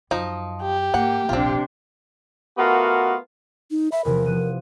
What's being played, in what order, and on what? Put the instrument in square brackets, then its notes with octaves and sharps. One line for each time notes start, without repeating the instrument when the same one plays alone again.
[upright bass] F#2 [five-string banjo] F3 D#4
[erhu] G4
[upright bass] G#2 [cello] A#3 [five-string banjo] F#5
[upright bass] D#1 A#1 [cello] C3 D4 [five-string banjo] C4 F4
[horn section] A3 B3 F4 F#4 A#4
[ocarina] D#4
[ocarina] E5 [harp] B5
[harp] E2 C3 F3 [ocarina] A#4
[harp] F3 F#6 D#7